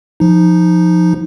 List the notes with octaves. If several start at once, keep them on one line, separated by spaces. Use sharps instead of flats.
F3 D#4